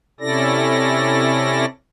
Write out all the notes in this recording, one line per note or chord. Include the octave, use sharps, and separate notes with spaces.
C3 C#4 E4 A4 D5 A#6